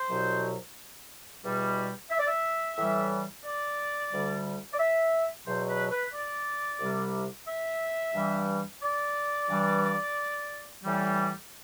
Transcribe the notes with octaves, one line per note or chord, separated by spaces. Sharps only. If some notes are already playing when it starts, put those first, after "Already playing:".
Already playing: C5
C2 B2 F#3
E2 B2 G3
E5
D5
E5
A2 E3 G3
D5
D2 D3 G3
D5
E5
E2 B2 F#3 C5
B4
B4
D5
C2 C3 G3
E5
G2 E3 G3
D5
G2 E3 G3
A2 E3 G3